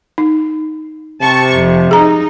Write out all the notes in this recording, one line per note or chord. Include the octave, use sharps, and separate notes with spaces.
D#4
C3 A5 C#6
F2
D#4 G#4 A#5